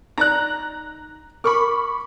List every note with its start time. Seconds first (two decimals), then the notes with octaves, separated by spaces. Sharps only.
0.18 D#4 D5 A#5 F#6
1.44 A#4 B5 C#6 D6